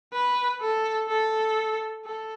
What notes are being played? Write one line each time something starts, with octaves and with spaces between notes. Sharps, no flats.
B4
A4
A4
A4